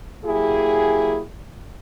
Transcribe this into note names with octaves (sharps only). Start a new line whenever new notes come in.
F#3 A#3 E4 G4 G#4